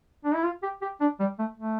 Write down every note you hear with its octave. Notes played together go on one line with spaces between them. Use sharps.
D4
E4
F4
G4
G4
D4
G3
A3
A3